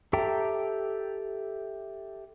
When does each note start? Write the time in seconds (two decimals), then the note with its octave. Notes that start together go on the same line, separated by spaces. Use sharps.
0.13 G4 A4 E5 G5 A#5